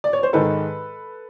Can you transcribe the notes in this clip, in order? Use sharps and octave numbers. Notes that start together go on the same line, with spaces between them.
D5
C#5
C5
G#2 D#3 G#3 A4 B4